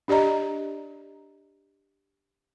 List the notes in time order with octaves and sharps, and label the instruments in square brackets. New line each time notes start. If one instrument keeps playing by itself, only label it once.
[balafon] D4 G4 D5 D#5 A#5